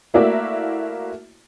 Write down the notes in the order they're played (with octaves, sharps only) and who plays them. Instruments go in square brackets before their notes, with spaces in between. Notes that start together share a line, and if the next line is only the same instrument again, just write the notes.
[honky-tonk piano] A3 A#3 E4 F#4 D5 E5